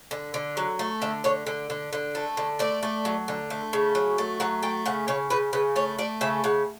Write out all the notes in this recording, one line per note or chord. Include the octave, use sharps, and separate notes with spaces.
D3
D3
F#3
A3
D3 E5
D3 C#5
D3
D3
D3
A3
D3
A3 D5
A3
F#3
D3
A3
C#3
F#3
A3
F#3 F#5
A3 G5
C#3 F#5
C#3 C#5
C#3 B4
C#3 B4
A3 C#5
A3 D5
C#3 E5
C#3 F#5